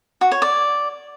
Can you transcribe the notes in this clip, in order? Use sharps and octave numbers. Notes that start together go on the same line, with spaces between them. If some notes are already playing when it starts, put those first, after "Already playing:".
F#4
C#5
D5